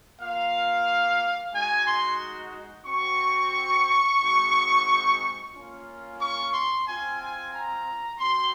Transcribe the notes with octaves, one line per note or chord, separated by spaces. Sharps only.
A#3 F4 F5
G#3 D#4 F#4 G#5
C6
C4 F#4 C#6
G#3 C4 D#4 F#4
A#3 C#4 F4
C#6
C6
C4 F4 G#5
G#5
A#5
C4 F#4 C6